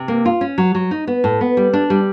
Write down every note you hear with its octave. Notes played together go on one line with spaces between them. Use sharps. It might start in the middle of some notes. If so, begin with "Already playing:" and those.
Already playing: C3
A#3
F4
C#4
F#3
F#3
D#4
B3
A2
B3
G3
D4
G3